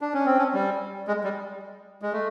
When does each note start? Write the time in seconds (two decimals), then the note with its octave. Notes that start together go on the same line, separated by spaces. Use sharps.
0.01 D4
0.14 C#4
0.25 C4
0.39 C#4
0.54 G3
1.07 G#3
1.24 G3
2.02 G#3
2.12 A3